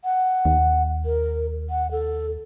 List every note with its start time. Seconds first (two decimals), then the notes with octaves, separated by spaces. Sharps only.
0.04 F#5
0.45 D#2
1.05 A#4
1.70 F#5
1.91 A4